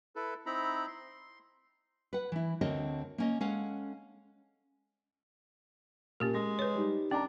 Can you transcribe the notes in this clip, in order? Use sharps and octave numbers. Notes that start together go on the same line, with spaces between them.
E4 A4 B4
C4 D#4 E4 A#5 B5
C6
B4 F#5
E3 E4
D2 D3 C4 A#4 C#5 D#5
A#3 C#4 D#5
G#3 C#4 A4 F5 F#5
A#2 C#4 G4 A#4
G#3 A#6
B4 C#5
G3 D#4
C#4 D4 G5 A#5